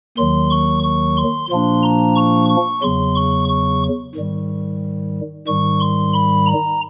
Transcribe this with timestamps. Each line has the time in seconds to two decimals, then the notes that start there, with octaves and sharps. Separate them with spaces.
0.17 D#2 D#3 F#3 C6
0.50 C#6
0.84 C#6
1.17 C6
1.50 A#2 F3 A#3 D4 C6
1.83 A#5
2.16 C#6
2.49 C#6
2.82 E2 C#3 F#3 C6
3.15 C#6
3.49 C#6
4.15 G#2 D#3 G3
5.47 G#2 D#3 G3 C#6
5.80 C6
6.13 B5
6.46 A#5